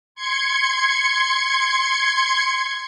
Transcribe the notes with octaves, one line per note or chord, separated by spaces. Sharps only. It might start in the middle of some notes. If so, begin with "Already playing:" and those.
C6 G#6 C#7